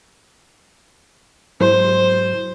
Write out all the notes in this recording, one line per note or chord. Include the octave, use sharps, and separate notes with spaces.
G#2 F#3 E4 C5